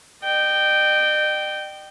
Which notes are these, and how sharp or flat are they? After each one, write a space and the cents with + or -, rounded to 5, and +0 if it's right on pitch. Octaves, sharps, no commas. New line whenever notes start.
D#5 -45 G5 -10